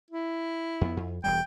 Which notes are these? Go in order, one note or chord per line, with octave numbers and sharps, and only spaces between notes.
E4
F2 B3
F2
E1 E2 G3 G5